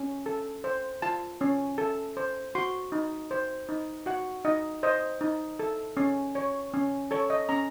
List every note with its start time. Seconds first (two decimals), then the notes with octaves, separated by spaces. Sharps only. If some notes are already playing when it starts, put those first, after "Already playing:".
Already playing: C#4
0.26 A4
0.64 C5
1.02 F4 A5
1.41 C#4
1.78 A4
2.17 C5
2.55 F#4 C6
2.92 D#4
3.31 C5
3.69 D#4
4.06 F#4 F#5
4.45 D#4 D#5
4.83 C5 D#5
5.21 D#4
5.59 A4
5.97 C#4
6.35 C#5
6.74 C#4
7.11 A4 C#5
7.30 D#5
7.49 C#4 A#5